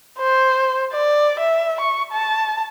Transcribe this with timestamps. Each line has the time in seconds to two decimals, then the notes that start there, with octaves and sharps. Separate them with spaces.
0.18 C5
0.93 D5
1.40 E5
1.81 C#6
2.13 A5